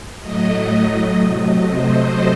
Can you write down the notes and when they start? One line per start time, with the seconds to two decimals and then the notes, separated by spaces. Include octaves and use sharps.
0.21 A2 F#3 A3 D#5
1.20 C3 F#3 A3 D#5
1.69 C5